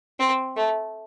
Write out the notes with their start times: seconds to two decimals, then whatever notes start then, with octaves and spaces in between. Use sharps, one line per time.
0.19 C4
0.57 A3